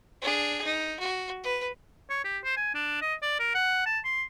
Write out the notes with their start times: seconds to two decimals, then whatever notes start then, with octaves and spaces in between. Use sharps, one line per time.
0.22 D4 G#4
0.64 D#4
1.00 F#4
1.44 B4
2.09 C#5
2.25 G4
2.44 C5
2.57 G#5
2.74 D4
3.01 D#5
3.22 D5
3.39 A#4
3.55 F#5
3.86 A5
4.04 C6